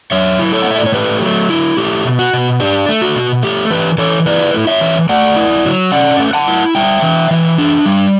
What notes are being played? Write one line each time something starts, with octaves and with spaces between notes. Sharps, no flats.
F#3 C#5 E5
E4
A4 C#5
F#5
A2 E5
D5
C#5
A3 G4 B4
F#3
E4
A3 G4
B2
F#4
B2
D4 G4
A3
F#4
B2
A3 G4
E3 G4 B4
E3 A4 C#5
E4 B4 D5
A3
C#5 E5
E3
A3 D5 F#5
E4
F#3
C#4 D5 F#5
A3
F#5 A5
E4
G3 E5 G5
E3
E3
D4
G3